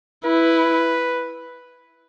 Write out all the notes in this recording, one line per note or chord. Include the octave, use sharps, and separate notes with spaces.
E4 B4